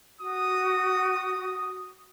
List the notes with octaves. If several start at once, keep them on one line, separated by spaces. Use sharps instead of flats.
F#4 D#6